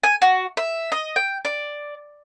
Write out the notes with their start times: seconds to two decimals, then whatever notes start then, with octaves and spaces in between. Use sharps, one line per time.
0.03 G#5
0.22 F#4
0.57 E5
0.92 D#5
1.16 G5
1.45 D5